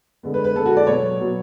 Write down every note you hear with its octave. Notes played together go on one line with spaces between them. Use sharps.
D3 G#3 B3
B4
B4
D3 G#3 B3 A4
F#4
D5
B2 F#3 B3 C#5
B2 F#3 B3